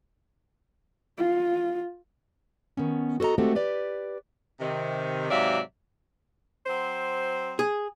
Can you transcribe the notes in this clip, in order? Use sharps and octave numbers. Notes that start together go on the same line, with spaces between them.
F4
D#3 B3 C#4
F#4 A4 B4 D#5 A#5
G#3 A3 C4 F#4 G4 A4
G4 B4 D5
C3 D#3
G#2 C3 F#3 D5 E5 F5
F#3 C4 C5
G#4